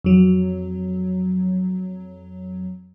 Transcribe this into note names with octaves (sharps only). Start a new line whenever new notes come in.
F2 F#3